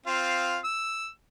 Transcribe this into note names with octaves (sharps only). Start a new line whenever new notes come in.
C4 F4 F5
E6